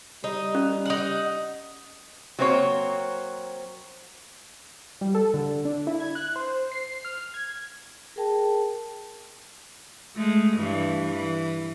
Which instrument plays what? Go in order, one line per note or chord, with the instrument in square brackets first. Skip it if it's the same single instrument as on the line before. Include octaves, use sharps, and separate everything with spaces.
[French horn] G3 [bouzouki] D#4
[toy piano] C#4
[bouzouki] D#4 F#5
[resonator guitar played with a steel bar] F#3 A#3 C4 C5 C#5
[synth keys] G3
A4
D3
D4
E4
G#6
F#6
C5
C7
F6
G#6
[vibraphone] G#4 A#4 G5 A5
[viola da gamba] G#3 A3
G2 E3
E3